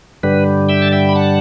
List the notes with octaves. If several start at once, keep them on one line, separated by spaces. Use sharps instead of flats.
G2 D3 G3 B4
E5 G5
A5
E5 G5
B5
F#5 A5